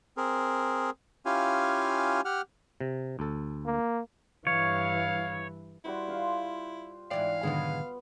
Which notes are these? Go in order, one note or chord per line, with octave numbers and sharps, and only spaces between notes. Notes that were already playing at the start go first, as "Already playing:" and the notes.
C4 G#4 A#4
C#4 E4 F4 G4 F5 G#5
G4 F#5 F6
C3
D2 A4
A#3
G2 E3 C#5 F5
G3 E4 F#4 C5
F4 F5 C6
G#2 E3 D5 F5 G5
G#2 B2 D3 D#3 F#3 G#3 B3